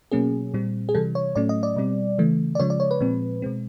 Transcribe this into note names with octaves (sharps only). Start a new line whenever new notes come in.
B2 F#3 A#3 C#4 G#4
A#2 G3 C4
G#4
C3 E3 G3 A4
C#5
A2 F#3 A3 C#4 D5
D#5
D5
B2 G3 C4
C#3 E3 A3
D5
C#3 F3 G#3 C#5
D5
C#5
B4
A#2 F3 G#3 C4
B2 G#3 C4